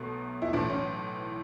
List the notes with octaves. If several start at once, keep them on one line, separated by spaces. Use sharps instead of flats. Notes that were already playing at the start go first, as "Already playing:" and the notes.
Already playing: B1 B2 F#3 A3
E4
B1 A2 E3 D4
C#4